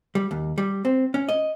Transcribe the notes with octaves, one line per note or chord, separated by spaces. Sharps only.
G3
D#2
G3
C4
C#4
D#5